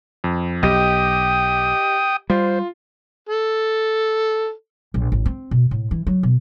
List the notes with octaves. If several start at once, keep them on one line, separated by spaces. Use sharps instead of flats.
F2
B1 G4 D#5 G5 D#6
G3 F4 C5
A4
A#1
A1
C4
B2
A2
E3
F#3
B2